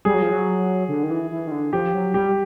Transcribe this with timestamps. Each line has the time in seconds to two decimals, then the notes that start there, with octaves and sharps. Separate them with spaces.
0.05 G3 G#4
0.14 F#3
0.22 F3
0.31 F#3
0.88 D3
1.03 D#3
1.10 E3
1.31 E3
1.47 D#3
1.52 D3
1.73 F3 G4
1.94 F#3
2.14 G3 G4